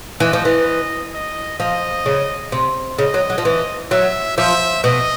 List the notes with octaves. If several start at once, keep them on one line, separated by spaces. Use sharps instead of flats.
E3 D#5
F3
E3
D#5
F3 D#5
C#3
C3
C#3 D#5
F#3
F#3
F3
E3
F#3 E5
F3 E5
B2 D#5